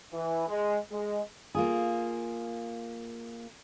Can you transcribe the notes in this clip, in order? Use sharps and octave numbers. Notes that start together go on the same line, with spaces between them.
E3
G#3
G#3
A#3 F4 G#4